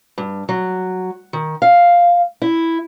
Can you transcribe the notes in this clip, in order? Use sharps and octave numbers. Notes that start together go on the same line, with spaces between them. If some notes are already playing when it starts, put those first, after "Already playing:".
G2
F#3
D#3
F5
E4